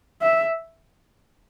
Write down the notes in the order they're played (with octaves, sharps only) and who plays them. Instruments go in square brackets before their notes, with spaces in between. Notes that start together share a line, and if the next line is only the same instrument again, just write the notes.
[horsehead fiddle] E5